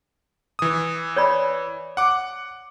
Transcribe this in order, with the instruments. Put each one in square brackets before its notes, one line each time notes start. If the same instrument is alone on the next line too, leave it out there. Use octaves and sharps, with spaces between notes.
[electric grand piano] E3 D#6
[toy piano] C#5 D5 B5
[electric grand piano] F#5 D6